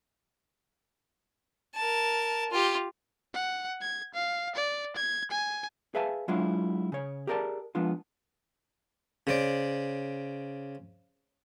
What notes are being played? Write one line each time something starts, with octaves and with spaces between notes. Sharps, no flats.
A#4 A5
F4 G4
F#5
G#6
F5
D5
G#6
G#5
G#4 B4 E5 F5 G#5 A5
F#3 G#3 D4 E4 F4
C#3 C#5
G4 G#4 A#4 C5 D5 A5
F3 G#3 B3 D4 F4
C#3 C5 D5